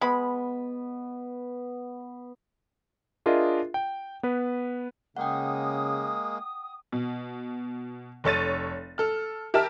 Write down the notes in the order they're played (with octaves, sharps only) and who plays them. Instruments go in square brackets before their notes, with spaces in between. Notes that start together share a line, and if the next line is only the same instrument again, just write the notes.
[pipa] G#3 B5 [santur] B3
[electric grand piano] D4 F4 G#4 A#4 D#5 E5
G5
B3 B4
[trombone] C#3 [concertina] G#3 A#3 [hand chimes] F#5 G5 [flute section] D#6
[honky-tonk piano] B2
F1 A4 C#5 A6 D#7
A4 F6
G4 A#4 E5 A5 F6